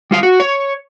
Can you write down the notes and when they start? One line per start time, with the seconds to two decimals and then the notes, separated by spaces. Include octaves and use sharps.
0.11 G3 F4 F5
0.23 F#4
0.40 C#5